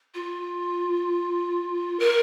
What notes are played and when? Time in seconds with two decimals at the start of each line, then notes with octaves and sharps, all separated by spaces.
0.14 F4
1.99 A#4